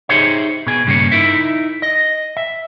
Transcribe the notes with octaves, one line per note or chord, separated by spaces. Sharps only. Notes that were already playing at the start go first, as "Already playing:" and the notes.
D#4 G4 G#4 C5 C#5 E5
B2 G#4
G2 C#3 G3 A3 A#3 C#4
D#4 E4 A#4 E5
D#5
E5